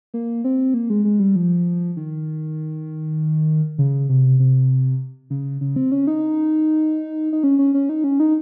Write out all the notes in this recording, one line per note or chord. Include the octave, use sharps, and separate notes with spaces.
A#3
C4
A#3
G#3
G#3
G3
F3
D#3
C#3
C3
C3
C#3
C#3
C4
C#4
D#4
D#4
C#4
C#4
C#4
D#4
C#4
D#4